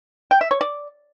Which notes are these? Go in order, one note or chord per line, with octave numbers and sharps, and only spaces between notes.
G5
E5
C#5
D5